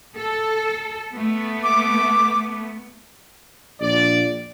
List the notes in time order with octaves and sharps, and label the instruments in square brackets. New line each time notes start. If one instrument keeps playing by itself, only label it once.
[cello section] A4
A3 B3
[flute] D6
[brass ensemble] A#1 D5